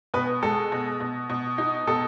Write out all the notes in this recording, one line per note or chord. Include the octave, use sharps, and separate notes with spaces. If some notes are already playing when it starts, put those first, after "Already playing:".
B2 B4
G#3 A4
B2
B2
B2
D#4
B2 A4